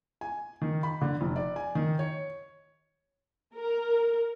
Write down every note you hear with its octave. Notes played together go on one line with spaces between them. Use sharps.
G#5
D#3
B5
D3
F1
D5
G#5
D#3
C#5
A#4